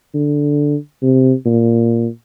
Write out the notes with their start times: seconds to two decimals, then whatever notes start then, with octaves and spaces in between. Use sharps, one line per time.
0.14 D3
1.02 C3
1.46 A#2